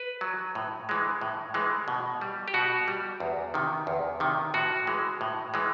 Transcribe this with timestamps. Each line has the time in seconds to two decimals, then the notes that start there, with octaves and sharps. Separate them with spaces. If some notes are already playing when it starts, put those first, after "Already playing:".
Already playing: B4
0.21 F#3
0.55 A2
0.89 E3 G#3
1.21 A2
1.54 E3 G#3
1.88 B2
2.21 G3
2.48 G4
2.54 B2 F#4
2.88 G3
3.20 E2
3.54 C3 D#3
3.87 E2
4.20 C3 D#3
4.54 A2 F#4
4.87 E3 G#3
5.21 A2
5.54 E3 G#3